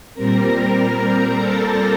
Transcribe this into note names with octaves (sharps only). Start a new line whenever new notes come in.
A#2 G3 C4 A#4 A#5
A4 A5